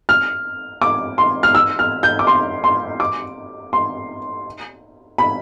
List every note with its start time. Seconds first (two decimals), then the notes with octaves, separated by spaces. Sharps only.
0.09 F6
0.82 D6
1.18 C6
1.43 F6
1.55 E6
1.79 F6
2.03 G6
2.19 D6
2.27 C6
2.64 C6
3.00 D6
3.73 C6
5.18 B5